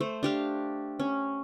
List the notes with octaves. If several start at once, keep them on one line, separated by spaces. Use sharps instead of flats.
A3 C5
D4 G4 F5
C#4